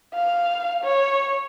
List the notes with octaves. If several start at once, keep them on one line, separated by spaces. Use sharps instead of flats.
F5
C#5